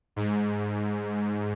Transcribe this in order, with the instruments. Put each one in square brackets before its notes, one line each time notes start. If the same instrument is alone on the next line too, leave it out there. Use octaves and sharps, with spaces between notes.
[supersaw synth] G#2